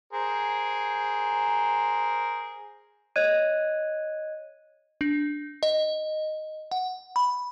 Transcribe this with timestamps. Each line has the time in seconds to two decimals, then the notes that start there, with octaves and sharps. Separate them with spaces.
0.13 G#4 A#4 C5
3.16 C#5 D#5 F#6 G#6 D#7
5.01 D4
5.63 D#5
6.71 F#5
7.16 B5